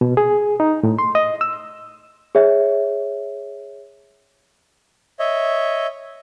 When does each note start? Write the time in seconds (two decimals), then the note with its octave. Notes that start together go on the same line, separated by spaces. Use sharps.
0.01 B2
0.17 G#4
0.60 D#4
0.83 A2
0.99 C6
1.15 D#5
1.41 E6
2.35 G#4 C#5 E5
5.19 C#5 D#5 E5